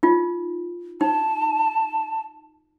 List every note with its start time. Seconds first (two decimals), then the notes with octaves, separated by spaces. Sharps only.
0.03 D#4 F4
1.01 D#4 A5